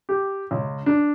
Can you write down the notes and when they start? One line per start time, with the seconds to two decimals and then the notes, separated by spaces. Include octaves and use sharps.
0.09 G4
0.51 C#2
0.86 D4